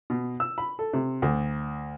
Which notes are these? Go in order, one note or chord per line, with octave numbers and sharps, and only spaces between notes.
B2
E6
B5
A4
C3
D2